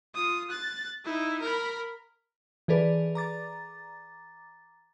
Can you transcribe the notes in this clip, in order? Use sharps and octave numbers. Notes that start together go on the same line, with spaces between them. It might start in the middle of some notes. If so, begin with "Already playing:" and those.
F4 D#6
F#6 A6
D#4 E4
A#4 B5
E3 G#4 A4 B4 D5
A#5 D6 A6